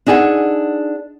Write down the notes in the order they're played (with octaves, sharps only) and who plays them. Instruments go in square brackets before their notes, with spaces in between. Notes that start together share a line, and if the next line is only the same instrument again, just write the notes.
[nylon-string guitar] D4 D#4 G#4 A4 F#5